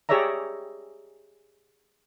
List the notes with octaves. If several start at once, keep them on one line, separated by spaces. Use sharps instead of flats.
G4 G#4 C#5 D5 E5 A#5